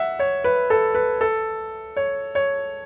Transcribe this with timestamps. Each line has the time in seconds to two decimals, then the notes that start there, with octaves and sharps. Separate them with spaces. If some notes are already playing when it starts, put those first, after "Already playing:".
Already playing: E5 F#5
0.19 C#5
0.44 B4
0.70 A4
0.95 B4
1.21 A4
1.96 C#5
2.35 C#5